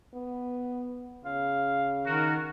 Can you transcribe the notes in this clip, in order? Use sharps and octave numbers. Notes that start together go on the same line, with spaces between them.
B3
C#3 F5
D#3 F#4 A#4